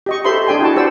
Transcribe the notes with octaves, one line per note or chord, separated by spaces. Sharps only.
G4 D#5 C#6
G4 A4 C5 E5 B5 C6
D4 G#4 D5 G5 G#5 C6
E4 F#4 G5 A5
F#4 G4 C5 D5 F#5 E6